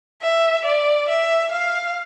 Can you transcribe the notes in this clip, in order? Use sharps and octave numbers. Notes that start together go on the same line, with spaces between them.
E5
D5
E5
F5